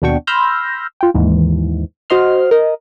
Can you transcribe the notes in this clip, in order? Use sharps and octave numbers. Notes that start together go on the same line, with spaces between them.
D#2 B2 D4 F#4 G5 C#6
B5 C6 E6 F6 G6 A#6
F4 G5
D#2 G#2 E3
F#4 C5 D#5 C6 F6
A#4 D#5